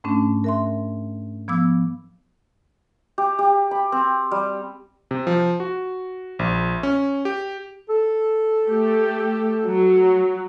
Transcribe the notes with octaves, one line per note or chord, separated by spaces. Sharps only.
G#2 A3 C#4 D4
A#4 E5 C6
F3 B3 D6 E6
G4
G4
B5
C4
G3
C3
F3
F#4
A#1
C#4
G4
A4
A3 G4
F#3